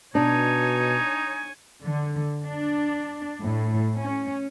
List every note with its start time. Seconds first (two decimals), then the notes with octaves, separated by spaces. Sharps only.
0.15 B2 D4 D#4 C#5 G#5
1.83 D3
2.45 D4
3.42 A2
3.98 C#4